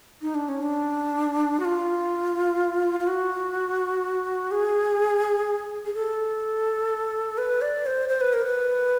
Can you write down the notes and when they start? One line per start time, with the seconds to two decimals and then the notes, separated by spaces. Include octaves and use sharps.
0.22 D#4
0.35 D4
0.49 C#4
0.62 D4
1.60 F#4
1.65 F4
3.00 F4
3.07 F#4
4.51 G#4
5.86 G#4
5.95 A4
7.38 B4
7.62 D5
7.86 C5
8.09 C5
8.21 B4
8.33 A#4
8.45 B4